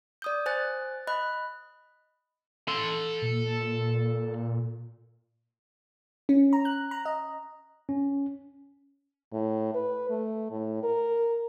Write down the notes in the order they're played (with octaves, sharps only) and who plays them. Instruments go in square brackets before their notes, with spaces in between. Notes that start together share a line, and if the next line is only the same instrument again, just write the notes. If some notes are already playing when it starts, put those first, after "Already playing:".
[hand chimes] D5 D#6 G6
C5 G#5 F#6 A6
D#5 B5 F#6
[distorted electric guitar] A4 C6
[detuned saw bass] A#2
[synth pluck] C#4
A#5
F#6
A#5
D#5
[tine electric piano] C#4
[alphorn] A2
B4
A3
A2
A#4